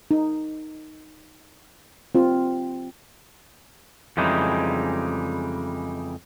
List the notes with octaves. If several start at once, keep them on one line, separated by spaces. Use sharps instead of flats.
D#4
C4 F4
F2 C#3 E3 G3 G#3 D#4